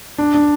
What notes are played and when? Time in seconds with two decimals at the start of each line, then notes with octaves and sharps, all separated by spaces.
0.18 D4
0.34 D4